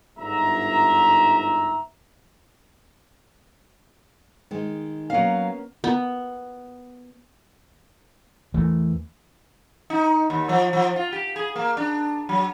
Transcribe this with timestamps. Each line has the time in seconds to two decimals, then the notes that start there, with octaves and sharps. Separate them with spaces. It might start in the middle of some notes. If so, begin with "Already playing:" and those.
0.18 G1 G#2 E5 A#5
4.51 D#3 G#3
5.10 F#3 A#3 B3 C#4 F5
5.84 B3
8.54 E2 E3 A3
9.90 D#4
10.30 D#2
10.49 F3
10.73 F3
10.96 F4
11.13 G4
11.36 G#4
11.56 A#3
11.77 D4
12.29 F#3